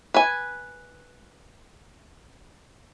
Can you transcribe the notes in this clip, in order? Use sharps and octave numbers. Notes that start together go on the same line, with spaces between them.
B4 G#5